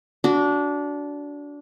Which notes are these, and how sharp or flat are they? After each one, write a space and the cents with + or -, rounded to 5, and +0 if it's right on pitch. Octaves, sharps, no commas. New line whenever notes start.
D4 -20 F#4 +0